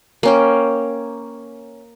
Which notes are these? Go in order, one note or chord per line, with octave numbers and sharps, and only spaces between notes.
A#3 C#4 G5